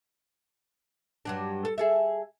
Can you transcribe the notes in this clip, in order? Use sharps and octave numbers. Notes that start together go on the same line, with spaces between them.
G2 F#3 D4
A4
G#4 A4 E5